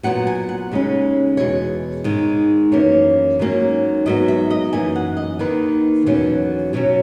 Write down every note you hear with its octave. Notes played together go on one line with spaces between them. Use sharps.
A#2 F#3 B3 F#5
G#5
F#5
D#2 C#3 G#3 C#4
E2 B2 G#3 C#5
G#2 D#3 G#3
F#2 E3 A#3 C#4 C#5
G#2 D#3 F#3 A#3 C#4
G#2 F#3 B3 D#5
E5
D#5
F#2 E3 A#3 G#5
F#5
D#5
D#2 D#3 A#3 B4
E2 B2 F#3 C#4
B2 F#3 C#4 C#5